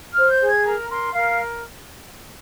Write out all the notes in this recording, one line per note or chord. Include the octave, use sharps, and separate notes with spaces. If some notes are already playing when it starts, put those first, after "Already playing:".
F6
C5
G6
G#4
G#6
A#4 A#5
A#4 C6
A#4 F5